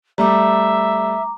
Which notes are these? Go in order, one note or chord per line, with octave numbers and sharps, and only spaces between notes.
G3 A3 E5 A#5 D6